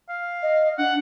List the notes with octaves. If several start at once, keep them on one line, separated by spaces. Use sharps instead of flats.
F5
D#5
D4 F#5